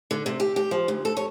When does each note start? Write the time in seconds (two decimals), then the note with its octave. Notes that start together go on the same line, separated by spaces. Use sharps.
0.11 D3
0.26 C3
0.40 G4
0.56 G4
0.71 F3
0.88 D2
1.05 A4
1.17 C#5